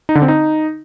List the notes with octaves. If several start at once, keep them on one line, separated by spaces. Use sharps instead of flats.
D#4
D3
C4
D#4